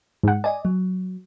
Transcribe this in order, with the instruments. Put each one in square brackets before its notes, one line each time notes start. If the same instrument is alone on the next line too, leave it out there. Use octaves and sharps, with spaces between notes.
[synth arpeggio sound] G#2 F#5
[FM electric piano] D5 D#5 [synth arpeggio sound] G#5
[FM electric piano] F#3